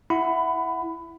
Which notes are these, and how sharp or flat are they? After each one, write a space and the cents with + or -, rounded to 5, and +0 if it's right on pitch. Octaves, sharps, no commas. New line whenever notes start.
E4 +0 F#5 -5 B5 +20